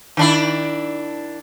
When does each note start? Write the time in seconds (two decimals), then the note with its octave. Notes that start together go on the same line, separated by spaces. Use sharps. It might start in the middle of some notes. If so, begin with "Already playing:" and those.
0.17 D#3 D4 E4